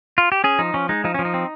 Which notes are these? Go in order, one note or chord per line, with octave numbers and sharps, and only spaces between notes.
F4
G4
C#4 G#4
F3 D#4
F3 C#4
G#3 D#4
F3 D#4
F3 C#4
D#4
C4